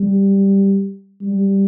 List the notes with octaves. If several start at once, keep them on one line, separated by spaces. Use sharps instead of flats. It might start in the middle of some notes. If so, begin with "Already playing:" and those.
Already playing: G3
G3